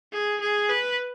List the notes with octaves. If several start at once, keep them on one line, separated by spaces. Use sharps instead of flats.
G#4
G#4
B4